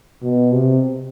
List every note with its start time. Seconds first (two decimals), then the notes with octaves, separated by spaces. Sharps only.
0.22 B2
0.52 C3